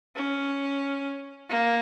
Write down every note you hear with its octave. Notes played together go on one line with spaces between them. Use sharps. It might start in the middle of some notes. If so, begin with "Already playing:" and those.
C#4
A#3